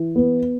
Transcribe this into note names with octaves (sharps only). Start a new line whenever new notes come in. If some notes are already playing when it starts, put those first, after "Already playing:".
Already playing: E3
B3